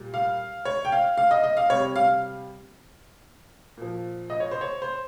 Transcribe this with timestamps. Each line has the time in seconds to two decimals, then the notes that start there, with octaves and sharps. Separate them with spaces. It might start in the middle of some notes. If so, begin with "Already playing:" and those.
Already playing: A#2 G3
0.14 F5
0.65 C#5
0.85 G5
0.92 F5
1.17 F5
1.31 D#5
1.44 D#5
1.57 F5
1.70 C3 G3 C#5
1.96 F5
3.77 A#2 F3
4.30 D#5
4.40 C#5
4.51 C5
4.61 C#5
4.82 C5